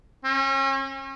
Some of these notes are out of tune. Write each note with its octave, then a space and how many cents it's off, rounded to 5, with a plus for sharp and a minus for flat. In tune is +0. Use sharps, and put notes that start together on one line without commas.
C#4 -35